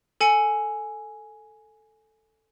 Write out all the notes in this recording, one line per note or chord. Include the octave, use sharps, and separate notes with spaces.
A4 G#5 C#7